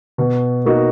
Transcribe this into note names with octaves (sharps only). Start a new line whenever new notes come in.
B2
A#3 D#4 F#4